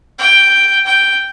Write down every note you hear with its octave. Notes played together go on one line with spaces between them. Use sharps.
G5
G5